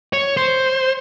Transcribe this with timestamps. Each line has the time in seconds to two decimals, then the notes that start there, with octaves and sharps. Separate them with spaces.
0.13 C#5
0.37 C5